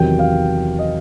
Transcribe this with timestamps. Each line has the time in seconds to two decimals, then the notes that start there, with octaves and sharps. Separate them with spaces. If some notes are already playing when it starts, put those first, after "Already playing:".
Already playing: E2 C3 D#3 F#3 G5
0.19 F5
0.79 D#5